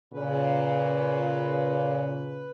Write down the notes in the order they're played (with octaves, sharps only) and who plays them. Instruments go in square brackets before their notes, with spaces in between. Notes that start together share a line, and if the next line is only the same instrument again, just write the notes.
[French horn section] A#2 C#3 [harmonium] B4